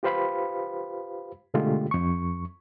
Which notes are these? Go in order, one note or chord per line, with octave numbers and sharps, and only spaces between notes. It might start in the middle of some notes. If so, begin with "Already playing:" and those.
F4 G4 B4 C5 F5 B5
B2 D3 G#3 A3 F4 G4
F2 C#6